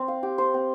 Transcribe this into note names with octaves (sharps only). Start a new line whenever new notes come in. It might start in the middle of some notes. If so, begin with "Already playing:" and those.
Already playing: C4 C5
F5
G4
C5
C4